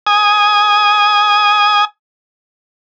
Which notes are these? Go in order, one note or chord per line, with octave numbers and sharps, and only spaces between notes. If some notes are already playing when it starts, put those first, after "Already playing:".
G#5 D#6